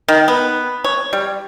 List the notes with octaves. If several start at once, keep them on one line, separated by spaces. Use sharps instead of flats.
D#3
B3
C#5
G3